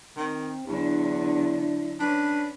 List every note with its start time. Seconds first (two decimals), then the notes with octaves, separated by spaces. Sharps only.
0.17 D#3 C4
0.66 E2 D3 F#3 D4 E4
2.00 C#4 D4 B4